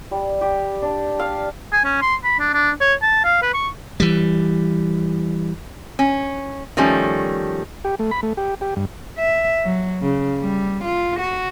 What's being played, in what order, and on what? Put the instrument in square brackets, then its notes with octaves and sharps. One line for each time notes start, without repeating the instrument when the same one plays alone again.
[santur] G3
G4
D4
F5
[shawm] G#5
C#4
C6
B5
D4
D4
C#5
A5
F5
B4
C#6
[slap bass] E3 G3
[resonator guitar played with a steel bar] C#4
D#3 F3 G3 A3 C#4
[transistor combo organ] G4
A3
B5
A3
G4
G4
G2
[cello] E5
F#3
C#3
G3
F4
F#4